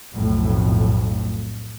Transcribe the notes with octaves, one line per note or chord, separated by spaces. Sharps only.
B1 F2 A2